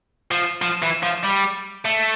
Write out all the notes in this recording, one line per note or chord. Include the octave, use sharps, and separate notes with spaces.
F3
F3
E3
F3
G3
A3